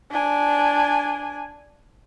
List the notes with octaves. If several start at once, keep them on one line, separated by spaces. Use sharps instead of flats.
D4 G#5